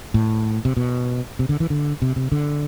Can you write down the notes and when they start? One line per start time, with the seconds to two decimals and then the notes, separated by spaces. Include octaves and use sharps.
0.14 A2
0.65 C3
0.77 B2
1.39 C3
1.49 D3
1.60 E3
1.70 D3
2.02 C3
2.16 C3
2.32 D3